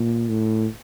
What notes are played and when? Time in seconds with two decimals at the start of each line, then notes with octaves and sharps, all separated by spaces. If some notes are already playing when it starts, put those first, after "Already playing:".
Already playing: A#2
0.29 A2